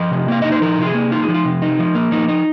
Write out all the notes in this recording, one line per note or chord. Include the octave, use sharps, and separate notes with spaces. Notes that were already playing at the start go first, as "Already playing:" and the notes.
Already playing: F3 D#5
C3
A#3 F5
D#4 D#5
C5
F3 A#4
C3 F4
G#4
A#3
D#4 F4
G#4
F3
F4
C3
D#4
F3
A#3
F3 D#4
D#4